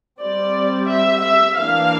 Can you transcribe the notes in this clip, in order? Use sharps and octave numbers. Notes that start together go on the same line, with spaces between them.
G3 C4 D5
E5
E5
E3 A#3 D4 F5